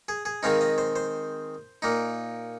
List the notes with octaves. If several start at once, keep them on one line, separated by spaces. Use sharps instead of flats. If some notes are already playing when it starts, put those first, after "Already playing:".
G#4
G#4
D#3 G#3 C4 D#4 F5
D#5
C5
C5
A#2 A#3 D#4